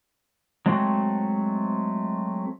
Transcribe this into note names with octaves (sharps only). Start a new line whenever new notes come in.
F#3 G#3 A3 C4 F#4